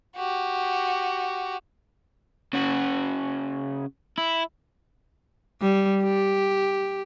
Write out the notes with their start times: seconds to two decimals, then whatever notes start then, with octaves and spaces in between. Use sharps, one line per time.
0.16 F#4 G4
2.53 C#3 F#4
4.18 E4
5.62 G3
6.03 G4